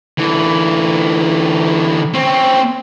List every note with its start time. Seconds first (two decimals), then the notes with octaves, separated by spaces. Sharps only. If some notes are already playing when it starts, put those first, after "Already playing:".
0.18 D3 E3
2.14 C4 C#4